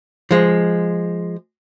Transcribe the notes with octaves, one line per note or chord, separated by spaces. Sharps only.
F3 G#3